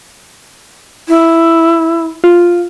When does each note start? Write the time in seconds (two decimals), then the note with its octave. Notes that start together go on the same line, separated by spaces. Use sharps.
1.09 E4
2.24 F4